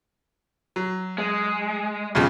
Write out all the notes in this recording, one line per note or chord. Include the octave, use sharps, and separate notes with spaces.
F#3
G#3
B1 F2 C#3